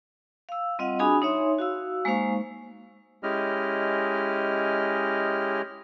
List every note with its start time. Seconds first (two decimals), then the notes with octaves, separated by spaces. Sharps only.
0.49 F5 E6
0.79 G3 C4 F4 D#5 F5 F#5
0.99 D4 F#4 G#4 G#5 B5 D#6
1.22 D#4 C#5 E5 C6
1.59 F#4 F5 E6
2.05 G#3 A#3 D#4 C5 F5 C#6
3.23 G#3 C#4 E4 G4 D#5 F6